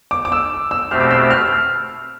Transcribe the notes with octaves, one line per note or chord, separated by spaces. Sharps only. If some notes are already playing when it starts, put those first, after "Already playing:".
D6
D6
E6
E6
B2 A3 C4 G4 C5 F6
D6
E6
F6